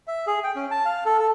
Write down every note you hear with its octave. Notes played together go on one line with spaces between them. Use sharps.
E5
G#4
G5
C#4
A5
F5
A4
A4